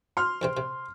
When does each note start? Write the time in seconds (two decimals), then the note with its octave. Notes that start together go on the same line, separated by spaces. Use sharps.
0.17 C6 F6
0.42 E2 C3 C4
0.57 C3